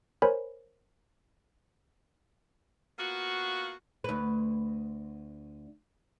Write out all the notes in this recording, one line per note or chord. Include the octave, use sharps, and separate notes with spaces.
A#4 C5 C#5 G#5 B5
A#3 B3 F4 F#4
D2 B4